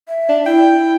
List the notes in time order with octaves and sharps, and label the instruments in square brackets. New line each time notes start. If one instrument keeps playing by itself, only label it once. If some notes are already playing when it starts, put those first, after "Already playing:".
[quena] E5
[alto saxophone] D4
[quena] E4 [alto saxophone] G5